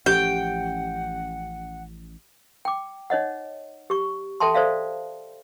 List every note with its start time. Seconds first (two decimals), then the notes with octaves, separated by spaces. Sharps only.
0.06 A1 F3 C#4 G4 F#5 G5
2.65 G5 D6
3.10 D#4 C#5 D#5 F#5
3.90 G4 C#6
4.40 A4 E5 G5 A5 C6
4.54 A4 C5 D5 E5 F5